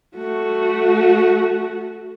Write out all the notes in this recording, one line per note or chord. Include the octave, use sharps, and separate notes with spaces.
A3 F#4